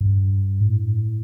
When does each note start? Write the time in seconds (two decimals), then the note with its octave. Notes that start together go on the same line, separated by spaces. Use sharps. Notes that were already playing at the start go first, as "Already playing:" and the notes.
0.01 G2
0.61 A2